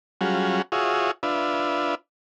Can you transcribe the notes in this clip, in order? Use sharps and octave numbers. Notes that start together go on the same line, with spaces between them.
F#3 G3 C#4 F4 F#4 G#4
F4 F#4 G#4 C#5 E5 D#6
D4 F4 B4 E5